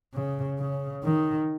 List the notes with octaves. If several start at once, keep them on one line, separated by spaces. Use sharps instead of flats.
C#3
C#3
D#3